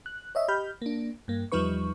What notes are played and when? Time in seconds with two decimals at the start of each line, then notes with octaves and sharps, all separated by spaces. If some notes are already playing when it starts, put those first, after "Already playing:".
0.06 F#6
0.35 C#5 D#5 E5
0.48 G4 D#5 B5 F6 G6
0.82 A#3 D4
1.28 G2 A#3
1.52 E2 F3 G3 D#4 B4 C#6